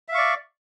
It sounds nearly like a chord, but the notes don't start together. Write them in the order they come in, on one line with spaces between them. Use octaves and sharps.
E5 F5 C#6 D5